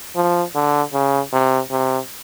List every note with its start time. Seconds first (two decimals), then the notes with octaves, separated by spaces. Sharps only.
0.16 F3
0.55 D3
0.93 C#3
1.33 C3
1.71 C3